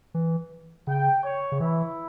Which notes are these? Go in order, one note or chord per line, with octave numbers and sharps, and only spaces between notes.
E3
C#3 G5
C#5
C#3
E3 E4